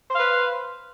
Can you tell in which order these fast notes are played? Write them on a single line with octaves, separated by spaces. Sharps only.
C5 F5 B4